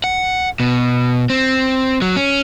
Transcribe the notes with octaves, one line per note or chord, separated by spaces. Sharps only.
F#5
B2
C4
F#3
C#4